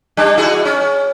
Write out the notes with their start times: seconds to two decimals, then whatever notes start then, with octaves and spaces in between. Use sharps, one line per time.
0.17 G3 D4
0.38 E4 F#4 G#4
0.65 C#4